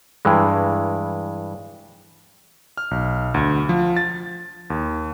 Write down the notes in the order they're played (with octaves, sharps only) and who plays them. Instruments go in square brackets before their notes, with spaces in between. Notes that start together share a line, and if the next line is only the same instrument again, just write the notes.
[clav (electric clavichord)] G2 E3 G#3
[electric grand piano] F6
B1
D2
F3
A6
D#2